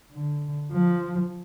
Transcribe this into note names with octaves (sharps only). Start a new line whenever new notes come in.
D3
F3